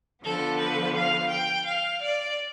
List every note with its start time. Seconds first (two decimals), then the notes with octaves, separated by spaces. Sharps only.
0.23 D3 F3 B3 A4
0.59 B4
0.95 F5
1.30 G5
1.65 F5
2.01 D5